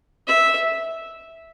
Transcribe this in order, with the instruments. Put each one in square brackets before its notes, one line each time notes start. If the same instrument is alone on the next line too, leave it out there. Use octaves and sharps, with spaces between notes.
[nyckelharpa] E5